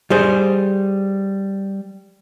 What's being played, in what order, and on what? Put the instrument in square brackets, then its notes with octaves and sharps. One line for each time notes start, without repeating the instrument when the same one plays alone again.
[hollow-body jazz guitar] G3 G#4 C5